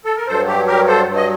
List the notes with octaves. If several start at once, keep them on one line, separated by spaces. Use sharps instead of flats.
A4
A#4
G2 F#3 A4 C5
G4
G4 A#4
A4 C5
G2 F#3
D#5